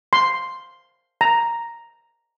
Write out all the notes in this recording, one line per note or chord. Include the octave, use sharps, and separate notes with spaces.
C6
A#5